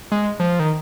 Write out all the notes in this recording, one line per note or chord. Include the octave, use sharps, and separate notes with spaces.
G#3
F3
D#3